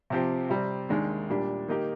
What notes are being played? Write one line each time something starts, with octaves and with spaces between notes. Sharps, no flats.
C3 F3 C4 G4
C3 G3 C4
D#2 D#3 G#3 D4
A#2 G3 D4 G4
D#3 A#3 D#4 G4